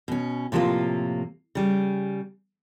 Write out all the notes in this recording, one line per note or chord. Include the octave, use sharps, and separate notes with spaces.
B2 C#4
A2 C3 F3 A3 A#3 F4
C#3 G3